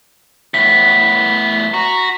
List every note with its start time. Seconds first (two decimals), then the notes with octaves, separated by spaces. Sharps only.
0.54 A2 B3 B6
1.74 F#4 A#5